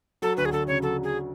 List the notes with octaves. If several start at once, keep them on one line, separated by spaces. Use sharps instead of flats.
F#3 A4
D2 B4
G#4
D2 A4
C#3 C#5
F#3 A4
F#3 G#4